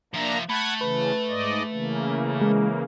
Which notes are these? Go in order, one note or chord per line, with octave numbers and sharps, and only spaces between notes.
F3 A#3 D4 E5 A#5
A3 F#5 B5 F#6 G#6
C#3 E3 B4
G#2 D5 D#5
C#3 E3 A#3
G#3